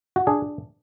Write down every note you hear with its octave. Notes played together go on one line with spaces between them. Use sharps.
F#4
D4 G#4